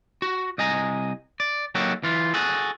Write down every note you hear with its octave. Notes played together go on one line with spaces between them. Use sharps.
F#4
C2 D#5 G#5 A#5
D5
F#3 A#3 D#4 F#4 G4 A4
E3 F4
F#4 G#4 A4